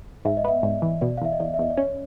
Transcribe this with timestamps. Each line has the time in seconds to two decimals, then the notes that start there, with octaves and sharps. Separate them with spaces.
0.25 G#2 E5
0.37 D#5
0.44 B3 E5
0.63 G#2 D5
0.82 E3
1.01 B2 D5
1.17 F5
1.21 E2 E5
1.32 D#5
1.40 E2 D5
1.54 E5
1.59 E2 D#5
1.70 D5
1.77 C#4 C#5